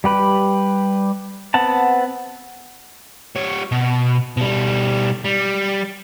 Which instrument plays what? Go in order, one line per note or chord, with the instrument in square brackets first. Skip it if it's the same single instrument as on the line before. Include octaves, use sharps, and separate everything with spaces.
[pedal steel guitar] G3 G4 B4
B3 C4 F#5 A5
[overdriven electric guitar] G3 C#5
B2
B2 G3
G3